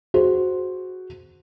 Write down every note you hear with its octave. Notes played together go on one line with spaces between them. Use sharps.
F#4 G#4 C5